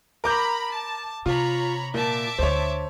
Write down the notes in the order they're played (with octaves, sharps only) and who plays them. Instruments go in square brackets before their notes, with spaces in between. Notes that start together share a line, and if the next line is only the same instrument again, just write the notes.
[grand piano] A#4 D6 G6 [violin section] A#5 B5
[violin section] A5
[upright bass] C3 [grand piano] F4 [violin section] C#5 A#5 B5
[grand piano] A#2 [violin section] E5 A5 D6
[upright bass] D2 D3 [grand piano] C5 C#5